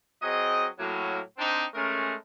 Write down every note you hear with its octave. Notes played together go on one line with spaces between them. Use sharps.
F#3 C4 G#4 D#5
A2 F#3 A#3
C4 D4 D#4
G#3 A3 C#4 A#4